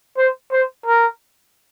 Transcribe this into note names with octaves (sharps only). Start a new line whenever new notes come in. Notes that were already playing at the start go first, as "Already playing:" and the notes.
C5
C5
A#4